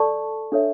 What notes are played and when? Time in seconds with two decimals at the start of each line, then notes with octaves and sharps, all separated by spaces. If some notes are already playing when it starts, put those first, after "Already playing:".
Already playing: A4 D5 A5 C#6
0.52 D4 A4 C#5 E5